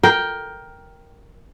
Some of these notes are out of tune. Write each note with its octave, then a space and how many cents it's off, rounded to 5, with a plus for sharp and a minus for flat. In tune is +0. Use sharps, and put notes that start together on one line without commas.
A#4 +10 G5 +0